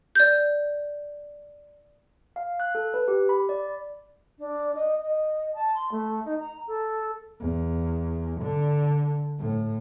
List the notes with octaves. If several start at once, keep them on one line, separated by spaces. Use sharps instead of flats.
D5 G6
F5
F#6
A4
B4
G4
B5
D5
D4
D#5
D#5
A5
C6
A3
D#4
A#5
A4
E2
D3
A2